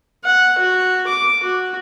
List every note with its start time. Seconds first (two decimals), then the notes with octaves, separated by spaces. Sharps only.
0.25 F#5
0.58 F#4
1.08 D6
1.43 F#4